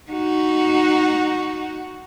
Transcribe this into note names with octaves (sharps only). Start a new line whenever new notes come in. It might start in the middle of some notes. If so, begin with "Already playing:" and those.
D#4 F#4